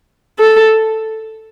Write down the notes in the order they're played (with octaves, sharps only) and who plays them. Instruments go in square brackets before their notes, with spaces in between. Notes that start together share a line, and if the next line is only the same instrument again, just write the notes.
[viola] A4